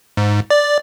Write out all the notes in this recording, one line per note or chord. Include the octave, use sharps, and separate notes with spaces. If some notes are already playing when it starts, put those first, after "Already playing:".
G#2
D5